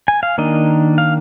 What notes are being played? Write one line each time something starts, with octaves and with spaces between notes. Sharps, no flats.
G#5
F5
D#3 A#3 D4 D#5
F5